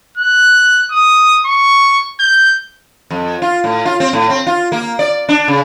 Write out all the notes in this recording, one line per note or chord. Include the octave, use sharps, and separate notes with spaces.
F#6
D#6
C#6
G6
F2
F4
A2
F4
C4
A2
C4
F4
A#3
D5
D4
C#3